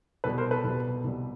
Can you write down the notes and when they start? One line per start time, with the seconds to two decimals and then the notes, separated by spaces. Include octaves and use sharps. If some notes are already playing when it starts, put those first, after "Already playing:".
0.24 C2 B2 G3 A4 B4
0.38 A#4 C5
0.51 A4 B4
0.64 C2 B2 G3
1.04 C2 B2 G3